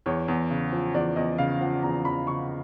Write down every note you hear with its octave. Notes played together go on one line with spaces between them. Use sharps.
E2 C#5
E2
C#3
F3
E2 D5
E2 D#5
C#3 F5
F3 F#5
E2 A#5
E2 B5
C#3 C#6